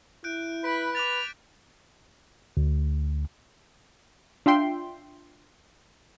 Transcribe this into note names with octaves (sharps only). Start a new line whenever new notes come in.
E4 F#6 G6 D7
B4 B5 B6 D7
D6 F#6 A6 F7
D2
D4 F4 E5 G5 C6